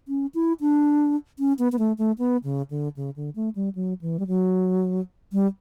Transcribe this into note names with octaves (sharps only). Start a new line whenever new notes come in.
C#4
E4
D4
C#4
B3
B3
A3
A3
B3
C#3
D3
C#3
D3
A3
G3
F#3
E3
G3
F#3
G3